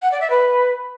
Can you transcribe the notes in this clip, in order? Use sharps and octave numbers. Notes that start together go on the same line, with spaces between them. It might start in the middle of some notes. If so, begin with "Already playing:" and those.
F#5
D5
E5
B4